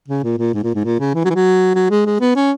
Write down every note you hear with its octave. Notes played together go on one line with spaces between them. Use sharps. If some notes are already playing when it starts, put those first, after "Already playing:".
C#3
A#2
A#2
G#2
A#2
G#2
A#2
C#3
E3
F#3
E3
F#3
F#3
G#3
G#3
B3
C#4